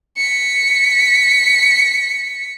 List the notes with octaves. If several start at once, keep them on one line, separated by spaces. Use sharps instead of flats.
B6 C#7